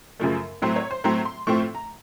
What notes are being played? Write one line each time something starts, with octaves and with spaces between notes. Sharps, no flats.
F#2 C#3 F3 A3
A2 F#3 A3 C4
C#5
C5
A2 F#3 A3 C4 A#5
C6
A2 F3 A3 C4 C#6
A#5